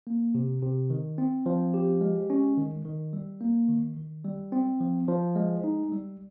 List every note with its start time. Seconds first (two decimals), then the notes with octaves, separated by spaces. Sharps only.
0.07 A#3
0.35 C3
0.62 C3
0.90 D#3
1.18 C4
1.46 F3
1.74 G4
2.01 G#3
2.30 C#4
2.57 D#3
2.85 D#3
3.13 G3
3.41 A#3
3.69 D#3
3.97 D#3
4.25 G3
4.52 C4
4.80 F3
5.08 F3
5.36 G#3
5.64 D#4
5.92 G3